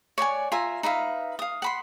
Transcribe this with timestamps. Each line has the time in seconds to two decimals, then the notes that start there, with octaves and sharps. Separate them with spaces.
0.18 C#5 D5 F#5 G#5
0.52 F4 E5 G#5 A#5
0.83 D#4 B4 E5 F5
1.39 F5 D#6
1.62 F#5 B5 C6